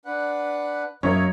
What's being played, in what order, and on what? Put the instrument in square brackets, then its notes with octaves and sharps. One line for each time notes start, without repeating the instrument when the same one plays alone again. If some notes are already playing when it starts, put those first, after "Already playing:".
[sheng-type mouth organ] D4 B4 F#5
[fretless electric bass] F#2 [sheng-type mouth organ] A#3 D#5 [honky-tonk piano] A#4 C#5 E5